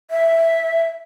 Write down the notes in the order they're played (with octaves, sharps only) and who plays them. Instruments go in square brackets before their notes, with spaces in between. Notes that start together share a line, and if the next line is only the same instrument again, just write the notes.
[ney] E5